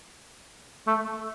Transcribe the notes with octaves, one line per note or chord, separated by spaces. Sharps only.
A3